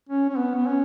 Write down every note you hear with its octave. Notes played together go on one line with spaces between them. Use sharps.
C#4
C#4
B3
B3
C#4